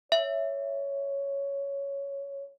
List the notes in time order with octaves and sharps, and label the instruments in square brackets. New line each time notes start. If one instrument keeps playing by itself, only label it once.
[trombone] C#5 [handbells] E5